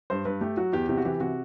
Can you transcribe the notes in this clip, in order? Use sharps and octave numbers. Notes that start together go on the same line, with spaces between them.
G2 C5
G2 B4
A3 G4
F#3 F#4
E2 G4
C3 G4
F#4
E3 G4
C3 F#4